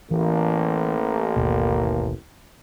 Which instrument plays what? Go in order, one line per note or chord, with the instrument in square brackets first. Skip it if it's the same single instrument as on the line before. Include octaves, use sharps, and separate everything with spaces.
[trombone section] A1 A#3 [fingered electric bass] E3
[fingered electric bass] G#1 D#2 B2